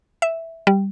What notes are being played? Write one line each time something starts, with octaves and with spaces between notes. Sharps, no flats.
E5
G3